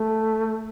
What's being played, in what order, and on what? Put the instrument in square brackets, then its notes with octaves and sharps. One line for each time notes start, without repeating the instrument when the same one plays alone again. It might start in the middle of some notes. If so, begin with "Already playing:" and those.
Already playing: [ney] A3